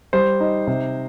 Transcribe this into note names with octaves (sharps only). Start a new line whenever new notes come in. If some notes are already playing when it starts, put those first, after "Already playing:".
G3 C5
D#4
C3